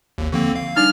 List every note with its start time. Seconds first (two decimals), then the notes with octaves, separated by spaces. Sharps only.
0.18 G#1 D#2
0.32 D3 F3 A#3 C4
0.56 F5
0.77 G3 D4 D#4 F6